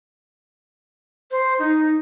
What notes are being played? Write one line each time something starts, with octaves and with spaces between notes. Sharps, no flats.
C5
D#4